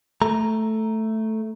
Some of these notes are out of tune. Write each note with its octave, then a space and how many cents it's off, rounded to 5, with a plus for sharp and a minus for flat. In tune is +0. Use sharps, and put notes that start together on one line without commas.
A3 +0 A#5 +0